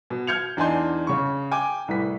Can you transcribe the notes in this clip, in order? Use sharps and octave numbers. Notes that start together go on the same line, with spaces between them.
B2
F6 G6 G#6 C#7 F7
E2 D4 D#4 G#5 C6 G6
C#3 C#6
G5 G#5 D6
C2 A2 B4 B6